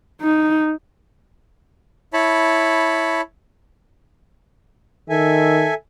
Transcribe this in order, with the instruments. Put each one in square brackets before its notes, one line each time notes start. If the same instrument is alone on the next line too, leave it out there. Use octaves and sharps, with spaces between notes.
[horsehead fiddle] D#4
[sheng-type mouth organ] E4 C#5 A5 B5
[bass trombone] D#3 [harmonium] A4 E5 G#5